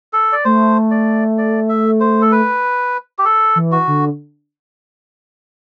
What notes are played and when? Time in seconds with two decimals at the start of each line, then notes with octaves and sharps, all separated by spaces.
0.13 A4
0.32 D5
0.45 A3 C5
0.91 D5
1.38 D5
1.69 E5
2.00 C5
2.22 A4
2.32 B4
3.19 G4
3.25 A4
3.56 E3
3.72 F#4
3.88 D3